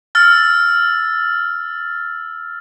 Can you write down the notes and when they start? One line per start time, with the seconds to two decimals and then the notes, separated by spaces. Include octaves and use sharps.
0.15 E6 F6 A6